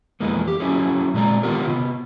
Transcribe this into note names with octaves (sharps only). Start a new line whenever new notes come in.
F2 E3 G#3 A#3 B3
G4
F#3 C#4 E4 F#4 G#4
A#2 G#3 D5 A#5
D#3 B3 F4 G4 A#4
C3 B3